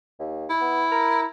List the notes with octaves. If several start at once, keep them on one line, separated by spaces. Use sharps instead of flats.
D#2
E4
B3
A#4